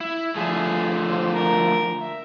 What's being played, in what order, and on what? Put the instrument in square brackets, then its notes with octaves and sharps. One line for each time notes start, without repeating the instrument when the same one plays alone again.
[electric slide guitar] E4
[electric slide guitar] D3 F3 A3 [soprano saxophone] G#4
[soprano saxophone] C5
A#4
E5